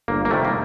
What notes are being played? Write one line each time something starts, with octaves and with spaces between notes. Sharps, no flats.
G1 A#3
A#3
F2 C3 D#3 G3 A3
A#3